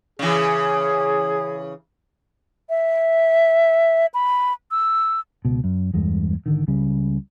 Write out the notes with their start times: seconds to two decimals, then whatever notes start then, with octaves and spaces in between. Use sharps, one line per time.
0.19 C#3 E3 G#4
2.69 E5
4.14 B5
4.71 E6
5.45 C#2 B2
5.64 F#2
5.94 E2 G2 G#3
6.46 G#1 D3 D#3
6.67 C#2 C#3 G3